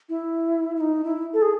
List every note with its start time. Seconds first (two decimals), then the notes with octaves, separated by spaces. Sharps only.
0.09 E4
0.76 E4
0.81 D#4
1.04 E4
1.33 A4
1.42 G#4